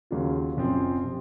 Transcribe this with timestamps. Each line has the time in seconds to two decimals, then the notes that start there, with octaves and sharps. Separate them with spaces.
0.11 D#2 C#3 F#3 A#3 F4
0.57 F#1 F#2 F3 C4
1.03 C3 F3